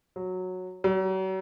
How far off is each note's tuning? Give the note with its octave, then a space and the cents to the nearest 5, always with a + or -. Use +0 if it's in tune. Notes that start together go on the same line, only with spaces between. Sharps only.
F#3 -10
F#3 +40